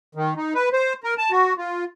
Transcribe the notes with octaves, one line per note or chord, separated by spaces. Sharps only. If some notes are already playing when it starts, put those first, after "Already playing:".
D#3
D#4
B4
C5
A#4
A5
F#4
F4